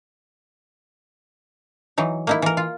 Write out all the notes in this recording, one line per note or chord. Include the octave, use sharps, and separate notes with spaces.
E3 F#3 D#4
A#3 D#4 E4
E3 A#4
F4